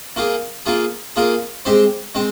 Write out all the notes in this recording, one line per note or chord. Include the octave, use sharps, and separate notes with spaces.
A#3 F4 G#4
A#3 F4 G#4
A#3 F4 G#4
G#3 C4 G4 C5
G#3 C4